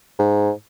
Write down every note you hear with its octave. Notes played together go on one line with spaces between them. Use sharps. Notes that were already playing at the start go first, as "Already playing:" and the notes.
G#2